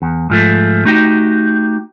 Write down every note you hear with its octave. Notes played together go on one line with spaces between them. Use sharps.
E2
G#2 F3 A3
A3 D#4 F#4 G4